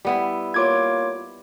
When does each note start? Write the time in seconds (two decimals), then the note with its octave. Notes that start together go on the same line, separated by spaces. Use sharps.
0.05 G3 B3 E4
0.54 A#3 F4 C#5 D6 G#6